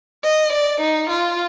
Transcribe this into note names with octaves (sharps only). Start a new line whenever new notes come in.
D#5
D5
D#4
F4